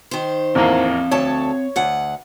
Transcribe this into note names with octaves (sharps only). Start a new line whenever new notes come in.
D#3 C5
A1 E2 A#3 C4 F5
D2 A4 C#5 A5
D2 F#5